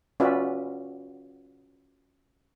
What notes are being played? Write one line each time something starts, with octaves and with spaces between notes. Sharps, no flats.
C#4 F4 F#4 B4 D5 E5